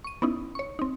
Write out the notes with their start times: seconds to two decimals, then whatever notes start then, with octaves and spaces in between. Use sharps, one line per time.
0.04 C#6 D#7
0.22 B3 C#4 D#4 E4
0.55 C#5 C#6
0.79 C4 D#4